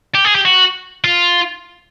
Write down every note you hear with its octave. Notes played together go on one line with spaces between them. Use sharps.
G4
G#4
G4
F#4
F4